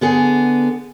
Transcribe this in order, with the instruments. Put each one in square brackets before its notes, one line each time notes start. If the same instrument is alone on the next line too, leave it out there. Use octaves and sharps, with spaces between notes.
[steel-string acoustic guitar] D3 B3 G#4